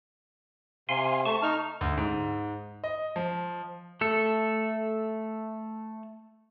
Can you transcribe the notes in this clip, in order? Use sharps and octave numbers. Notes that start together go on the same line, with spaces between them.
C3 F5 G#5 C6
A3 A5 C#6
D#4 F6
D2
G#2
D#5
F3
A3 A4